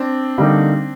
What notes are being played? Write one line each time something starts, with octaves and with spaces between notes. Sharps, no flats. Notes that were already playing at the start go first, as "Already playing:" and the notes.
Already playing: C4 D4
D3 G3 A#3 D#4